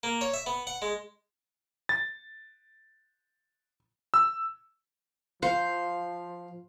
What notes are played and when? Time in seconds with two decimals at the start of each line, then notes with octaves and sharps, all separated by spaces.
0.03 A#3
0.21 C#5
0.34 E5
0.46 B3
0.67 F#5
0.82 G#3
1.89 A6
4.14 E6
5.43 F3 C5 F5